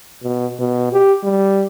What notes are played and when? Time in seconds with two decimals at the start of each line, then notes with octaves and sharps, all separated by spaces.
0.23 B2
0.60 B2
0.93 G4
1.23 G3